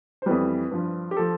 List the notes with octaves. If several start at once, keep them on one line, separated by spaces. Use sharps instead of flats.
C5
F2 E3 G3 B4
G2 F3
G4
F3 A4